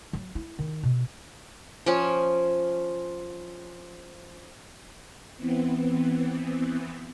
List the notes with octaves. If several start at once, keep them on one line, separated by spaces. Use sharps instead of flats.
F#3
E4
D#3
B2
F3 C#4
E3 B3 C4